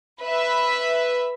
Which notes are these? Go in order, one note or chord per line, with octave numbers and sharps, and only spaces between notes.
B4 E5